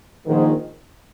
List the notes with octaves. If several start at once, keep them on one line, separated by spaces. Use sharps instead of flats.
A#1 G#2 D#3